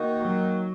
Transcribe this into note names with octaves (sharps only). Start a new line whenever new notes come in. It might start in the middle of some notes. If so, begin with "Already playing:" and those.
Already playing: D#3 A#3 D#4 F#4
F#3